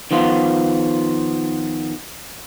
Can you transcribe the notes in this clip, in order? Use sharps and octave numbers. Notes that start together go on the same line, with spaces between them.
D#3 F3 B3 F4